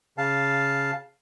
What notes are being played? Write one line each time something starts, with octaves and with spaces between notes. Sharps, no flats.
C#3 F5 A5